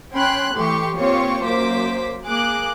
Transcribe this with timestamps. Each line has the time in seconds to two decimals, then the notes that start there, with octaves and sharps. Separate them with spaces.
0.14 C#4 G5 B5 C6 F#6
0.55 A2 E3 G4 C6 C#6
0.96 A#2 C4 F4 G4 C#5 C#6
1.43 F#2 A#3 C5 D6 B6
2.27 A#3 G#4 D6 F#6